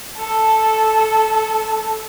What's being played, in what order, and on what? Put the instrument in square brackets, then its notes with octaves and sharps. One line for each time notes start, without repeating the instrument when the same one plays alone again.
[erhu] A4